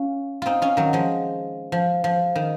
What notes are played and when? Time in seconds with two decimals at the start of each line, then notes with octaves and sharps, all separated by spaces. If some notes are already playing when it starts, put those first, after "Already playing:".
Already playing: C#4 F4
0.42 C4 D#4 F4
0.62 C#4 F4
0.77 D#3 F#3
0.93 F3 G#3
1.72 F3
2.04 F3
2.35 D#3